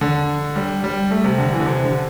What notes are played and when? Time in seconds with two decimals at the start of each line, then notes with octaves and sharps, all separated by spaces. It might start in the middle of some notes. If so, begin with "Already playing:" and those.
0.01 D3
0.56 G3
0.84 G3
1.11 A3
1.24 C3
1.38 D3
1.52 E3
1.60 D3
1.65 C3
1.84 D3